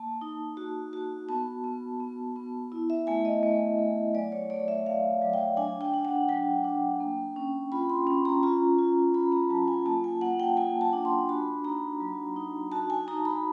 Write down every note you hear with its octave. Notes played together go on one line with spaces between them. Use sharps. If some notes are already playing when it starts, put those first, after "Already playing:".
Already playing: A#3 A5
D#4
F#4
F#4
B3 A5
B3
B3
B3
E4
E5
A3 G#5
D#5
A3
A3
F#3 D5
C#5
A3 D5
E5
A3 F5
F#3
G5
D4 G#5
G5
D4
F#5
F#3 G5
D4
A#3
C#4
F4 B5
C6
C#4
A#5
F4 A#5
F4
F4 B5
A#5
F#3 A5
G#5
A#3 A5
G#5
A#3 F#5
G5
A#3 G#5
A5
D4
C6
F#4 B5
D#4 A#5
F#3
D#4
F#4 A5
G#5
D#4 A#5
B5